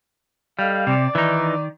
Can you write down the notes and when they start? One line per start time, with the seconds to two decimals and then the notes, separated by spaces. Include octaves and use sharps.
0.59 G3 A4 D#5 F5
0.87 C3 D5
1.15 D#3 E3 D#4